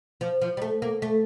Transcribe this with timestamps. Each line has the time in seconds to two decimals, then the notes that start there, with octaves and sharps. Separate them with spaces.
0.21 F3
0.42 F3
0.57 G3
0.62 A3
0.82 A#3
1.02 A3